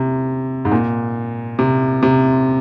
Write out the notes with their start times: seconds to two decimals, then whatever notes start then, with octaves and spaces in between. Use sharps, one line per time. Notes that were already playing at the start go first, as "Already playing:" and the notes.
Already playing: C3
0.65 G#2
0.72 A#2
1.59 C3
2.03 C3